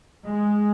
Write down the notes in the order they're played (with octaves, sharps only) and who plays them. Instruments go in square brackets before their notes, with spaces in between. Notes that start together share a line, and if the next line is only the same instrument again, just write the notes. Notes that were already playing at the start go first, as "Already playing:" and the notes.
[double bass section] G#3